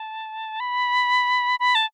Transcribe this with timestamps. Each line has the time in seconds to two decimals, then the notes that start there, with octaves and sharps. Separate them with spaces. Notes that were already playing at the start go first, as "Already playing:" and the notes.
Already playing: A5
0.60 B5
1.60 B5
1.75 A5